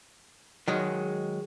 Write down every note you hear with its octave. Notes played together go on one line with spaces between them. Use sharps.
D#3 F#3 G#3